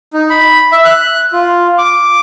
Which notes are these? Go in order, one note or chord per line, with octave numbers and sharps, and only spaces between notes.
D#4
B5
E5
F#6
F4
D6